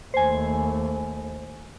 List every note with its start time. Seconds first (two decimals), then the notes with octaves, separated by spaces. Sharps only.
0.14 D#2 A3 C5 G#5